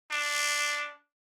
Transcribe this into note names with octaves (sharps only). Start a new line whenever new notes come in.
D4